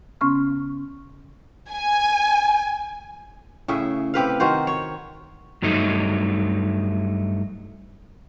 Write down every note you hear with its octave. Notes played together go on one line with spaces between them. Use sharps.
C#3 B3 C#4 C#6 F6
G#5
A2 C#3 G#4 E5
C3 G4 B4 F5
D#3 F#4 C5
C#5
G2 F#3 A3 D#4